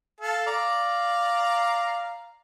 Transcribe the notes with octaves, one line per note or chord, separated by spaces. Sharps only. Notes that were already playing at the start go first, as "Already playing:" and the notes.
A4 F5 A5
D5 F5 A#5